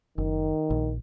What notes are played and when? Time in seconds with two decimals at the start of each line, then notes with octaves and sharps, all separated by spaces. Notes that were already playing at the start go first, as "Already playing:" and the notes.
0.18 F#1 D#3
0.70 A#1